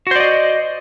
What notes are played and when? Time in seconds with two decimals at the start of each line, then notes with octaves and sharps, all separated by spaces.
0.07 F#4
0.11 C5
0.16 D5
0.20 D#5